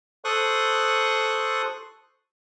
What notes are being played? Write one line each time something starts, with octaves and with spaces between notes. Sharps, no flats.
A4 C5 C6 C#6 D#6 F#6